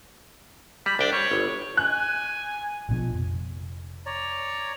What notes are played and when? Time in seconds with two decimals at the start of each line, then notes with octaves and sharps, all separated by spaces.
0.86 G3 B5
0.99 C2 D4 G5
1.13 G3 C#5
1.31 G1
1.77 G#5 F#6
2.89 A#1 B2 F3
3.13 F1
4.06 C#5 D5 A#5